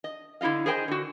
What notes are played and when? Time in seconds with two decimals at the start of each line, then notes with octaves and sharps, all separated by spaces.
0.04 D#5
0.41 D3 E4 F4 D#5 F5
0.66 G#4 A#4 C5 D#5 G5 G#5
0.88 D3 F#4